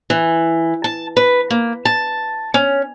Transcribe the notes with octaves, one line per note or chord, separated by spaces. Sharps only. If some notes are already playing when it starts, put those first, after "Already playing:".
E3
A5
B4
A#3
A5
C#4